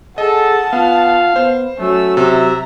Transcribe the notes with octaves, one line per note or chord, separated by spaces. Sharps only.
G#4 A4 D#5 F#5 A5
B3 F4 F5
B3 C5
F#3 A3 C#4 E6
C3 E5 A#5